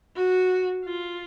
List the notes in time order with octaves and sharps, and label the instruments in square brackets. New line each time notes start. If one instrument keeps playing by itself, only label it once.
[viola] F#4
F4